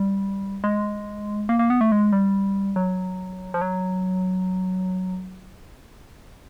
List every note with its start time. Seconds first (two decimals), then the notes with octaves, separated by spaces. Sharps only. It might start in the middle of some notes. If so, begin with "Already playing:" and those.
Already playing: G3
0.64 G#3
1.49 A#3
1.59 A#3
1.70 B3
1.81 A3
1.92 G#3
2.13 G3
2.76 F#3
3.54 F3
3.61 F#3